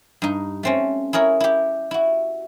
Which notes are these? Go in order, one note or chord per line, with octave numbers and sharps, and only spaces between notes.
G2 D#4
A3 C4 C#4
E4 G#4 A#4 C#5
E4 G4
E4 F#4